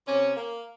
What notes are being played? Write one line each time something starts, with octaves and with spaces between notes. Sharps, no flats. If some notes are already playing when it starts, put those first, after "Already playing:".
C3 C#4
A#3